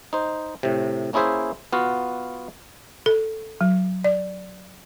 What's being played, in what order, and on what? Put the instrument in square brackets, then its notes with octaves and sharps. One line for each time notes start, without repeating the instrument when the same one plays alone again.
[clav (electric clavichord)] D#4 C5
A2 C3
A#3 C#4 E4 G#4 C5 E5
B3 F4 F#4 F5
[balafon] A4
F#3
D5